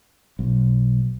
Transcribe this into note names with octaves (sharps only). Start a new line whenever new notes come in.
B1